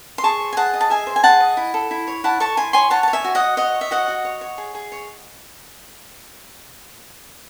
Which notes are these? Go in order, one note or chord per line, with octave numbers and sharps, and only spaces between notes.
C6
G#4 A5 C#6
C5
G#5
G#4 F#5 A5
D#5
A5
G#4 E5 G#5
C5
G#5
G#4 F#5 A5
D#5
E4
A4
E4
C#5
E4 F#5 A5
A4 A5 C#6
E4 G#5 C6
C#5 G#5 C6
C#5 F#5 A5
C#5 A5
E5 G#5
F#4
D#5 F#5
F#4
C#5 D#5 F#5
C#5
E5
F#4 D#5 F#5
F#4
C#5
C#5
G#4
G#4
C#5